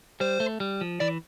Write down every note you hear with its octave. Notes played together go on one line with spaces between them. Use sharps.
G3 C5
A3
G3
F3
E3 D5